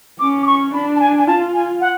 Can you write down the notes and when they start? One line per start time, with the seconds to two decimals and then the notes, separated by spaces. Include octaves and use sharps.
0.20 C#4 D6
0.43 D6
0.47 C#6
0.74 D4 B5
0.96 A5
1.00 G#5
1.18 G#5
1.27 F4 A5
1.54 G#5
1.81 F#5